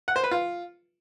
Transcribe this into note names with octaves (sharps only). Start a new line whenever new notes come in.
F#5
C5
B4
F4